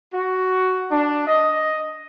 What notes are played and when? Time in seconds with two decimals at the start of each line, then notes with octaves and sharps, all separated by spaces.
0.14 F#4
0.91 D4
1.28 D#5